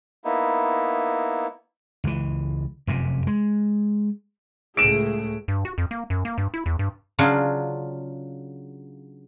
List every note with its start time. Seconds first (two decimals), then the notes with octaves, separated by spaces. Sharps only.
0.25 A#3 B3 D#4 E4
2.04 C#2 E3
2.87 F1 F#2 C3
3.27 G#3
4.77 C#2 A2 A3 G#4 D7 E7
5.48 G2
5.65 F#4
5.78 F2
5.91 A#3
6.10 F#2
6.25 A#3
6.38 G2
6.54 E4
6.66 E2
6.79 G2
7.19 C#3 F#3 D4 F4